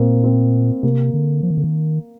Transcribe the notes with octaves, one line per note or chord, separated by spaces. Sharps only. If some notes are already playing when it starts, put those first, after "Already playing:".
Already playing: A#2 A#3 C4
C4
C3 A#3
D3
F3
D#3
D3
D#3